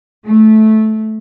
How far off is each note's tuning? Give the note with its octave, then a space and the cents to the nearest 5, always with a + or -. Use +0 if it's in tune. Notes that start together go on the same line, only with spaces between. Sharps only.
A3 -15